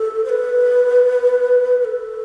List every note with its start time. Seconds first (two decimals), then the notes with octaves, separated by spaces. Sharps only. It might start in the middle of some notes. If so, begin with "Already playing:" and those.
Already playing: A4
0.24 C5
0.29 B4
1.81 B4
1.85 A4